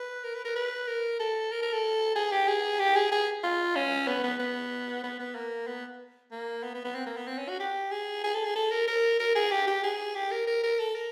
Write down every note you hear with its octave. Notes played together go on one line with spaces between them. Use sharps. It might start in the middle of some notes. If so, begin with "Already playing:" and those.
Already playing: B4
A#4
B4
A#4
B4
A#4
A4
A#4
A#4
A4
G#4
G4
G#4
G4
G#4
G#4
F4
C#4
B3
B3
B3
B3
B3
A#3
B3
A#3
B3
B3
B3
C4
A#3
B3
C4
C#4
F#4
G4
G#4
G#4
A4
G#4
A4
A#4
A#4
A#4
G#4
G4
G4
G#4
G4
A#4
A#4
A#4
A4
A#4